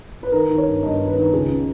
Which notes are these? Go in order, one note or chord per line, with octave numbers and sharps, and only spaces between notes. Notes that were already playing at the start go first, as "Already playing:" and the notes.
B4
D#3 A#4
D#3
C#5
G2
G2 D#5
D#3
B4
D#3
C#2 G#4
C#3